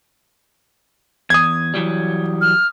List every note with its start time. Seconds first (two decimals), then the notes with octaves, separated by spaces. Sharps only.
1.30 E2 D#6 G#6
1.74 E3 F#3 G3
2.41 F6